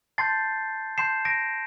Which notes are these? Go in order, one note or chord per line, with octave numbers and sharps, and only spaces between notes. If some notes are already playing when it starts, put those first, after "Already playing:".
A5 C6 G6 A6 C7
A5 C6 G6 C7 E7
A#6 D7